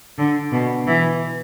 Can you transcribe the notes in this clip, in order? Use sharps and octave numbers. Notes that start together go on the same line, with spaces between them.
D3
B2
E3